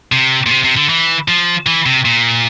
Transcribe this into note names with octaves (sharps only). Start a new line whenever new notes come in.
C3
A#2
C3
C3
D3
E3
F3
E3
C3
A#2